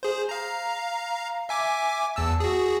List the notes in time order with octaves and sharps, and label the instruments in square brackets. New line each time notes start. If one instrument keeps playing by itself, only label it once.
[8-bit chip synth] G#4 C5
F5 A#5
E5 G#5 D6
E2 A5 E6
F#4 G#4